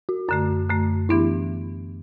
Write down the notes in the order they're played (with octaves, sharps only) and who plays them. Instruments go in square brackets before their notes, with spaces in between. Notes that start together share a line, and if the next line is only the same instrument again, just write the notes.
[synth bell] F#4
[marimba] F#2 D3 A3 [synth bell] F#4
[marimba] F#2 D3 A3
[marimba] E3 B3 D4 G4 [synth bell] E4